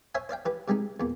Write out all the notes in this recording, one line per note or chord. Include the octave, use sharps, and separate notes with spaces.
C5 C#5 E5 F5 G#5
C5 D5 F5 G5
E3 G4 B4
C3 G3 G#3 D#4
E2 A#2